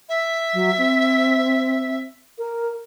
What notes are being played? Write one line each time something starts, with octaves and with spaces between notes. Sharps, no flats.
E5
F#3
C4
A#4